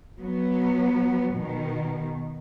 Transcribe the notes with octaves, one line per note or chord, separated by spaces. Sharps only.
F#3 B3
B2 D#3